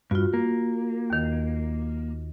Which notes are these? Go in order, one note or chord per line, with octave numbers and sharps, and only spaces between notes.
G2 F4 F#4
A#3
D#2 D#3